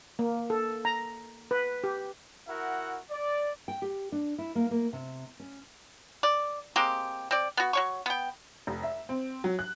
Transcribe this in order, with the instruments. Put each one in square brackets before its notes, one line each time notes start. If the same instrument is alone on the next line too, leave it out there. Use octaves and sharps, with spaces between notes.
[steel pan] A#3
A4
A#5
B4
G4
[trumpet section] E4 F#4 A#4 E5 F#5
D5
[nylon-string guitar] G5
G4
D4
E4
A#3
A#3
C3
C#4
[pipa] D5
G#3 A#3 C4 G4
C4 D5
B3 F#4
F#3 C#5 C#6
B3 G5
[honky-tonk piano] F1
E5
C4
F#3
F#6